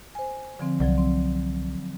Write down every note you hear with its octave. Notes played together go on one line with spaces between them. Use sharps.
C5 G#5
D3 F3 C4
C2 F3 F#3 D5
C4